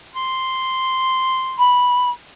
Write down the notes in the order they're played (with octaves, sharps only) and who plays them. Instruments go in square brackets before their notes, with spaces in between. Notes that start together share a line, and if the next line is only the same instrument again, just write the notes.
[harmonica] C6
[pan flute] B5